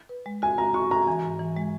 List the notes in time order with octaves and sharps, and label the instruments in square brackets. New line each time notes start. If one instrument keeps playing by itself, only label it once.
[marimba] B4
G#3
[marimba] F#4 [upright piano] G#5
[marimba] F#4 [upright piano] A#5
[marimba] F#4 [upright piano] C#6
[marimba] F#4 [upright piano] A#5
[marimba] E3 [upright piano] G#5
[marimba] G#2
E3
G#3